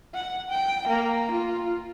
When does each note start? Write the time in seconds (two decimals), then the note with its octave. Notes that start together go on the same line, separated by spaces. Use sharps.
0.14 F#5
0.50 G5
0.88 A#3
1.31 F4